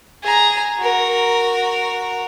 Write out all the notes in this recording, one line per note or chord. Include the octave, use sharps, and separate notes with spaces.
G#4 A#5
F#4 A#4